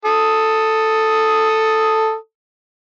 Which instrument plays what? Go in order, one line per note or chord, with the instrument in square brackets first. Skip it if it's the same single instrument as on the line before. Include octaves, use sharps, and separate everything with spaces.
[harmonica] A4 D#6